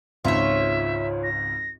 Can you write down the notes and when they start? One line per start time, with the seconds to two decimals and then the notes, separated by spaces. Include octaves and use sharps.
0.25 G#1 C#2 G#2 F4 C#5 E5
1.24 A#6